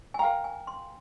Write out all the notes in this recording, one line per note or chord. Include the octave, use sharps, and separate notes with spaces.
G#5
A#4 F5 G5 A#5
G#5
C6